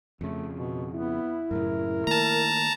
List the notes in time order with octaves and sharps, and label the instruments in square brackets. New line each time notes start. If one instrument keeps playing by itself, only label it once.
[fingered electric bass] F2 C#3 [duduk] A3
[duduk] B2
[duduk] B3 [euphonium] E4
[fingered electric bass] F#2 A2 C#3 [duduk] A#4
[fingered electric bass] D#3 A3 A#3 [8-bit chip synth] A5 A#5